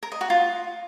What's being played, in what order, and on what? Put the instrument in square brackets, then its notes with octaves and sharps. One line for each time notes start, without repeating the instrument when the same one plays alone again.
[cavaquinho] A#4
D#5
F#4
F4